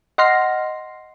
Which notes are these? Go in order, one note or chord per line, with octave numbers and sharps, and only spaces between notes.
D#5 F#5 C6 F6 A#6 C7